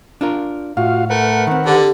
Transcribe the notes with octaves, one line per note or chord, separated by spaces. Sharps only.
D4 F4 A#4
A2 F4 F#4 F5
A3 A#4 B4 F#5
D#3 C4
D3 G4